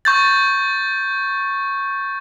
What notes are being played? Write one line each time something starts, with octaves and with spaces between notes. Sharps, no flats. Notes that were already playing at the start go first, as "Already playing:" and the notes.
C#6 G6 A6